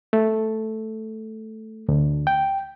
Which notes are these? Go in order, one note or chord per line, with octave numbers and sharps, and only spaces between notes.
A3
D2
G5